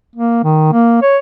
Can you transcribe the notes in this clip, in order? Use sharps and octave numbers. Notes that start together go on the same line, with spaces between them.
A#3
D#3
A#3
C#5